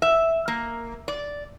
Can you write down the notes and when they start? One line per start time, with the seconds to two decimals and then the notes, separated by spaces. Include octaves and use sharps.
0.02 E5
0.48 A#3
1.08 D5